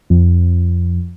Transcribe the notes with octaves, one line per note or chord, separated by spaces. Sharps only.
F2